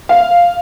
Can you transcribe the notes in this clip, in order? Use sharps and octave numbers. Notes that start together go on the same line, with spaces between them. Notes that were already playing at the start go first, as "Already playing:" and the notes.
F5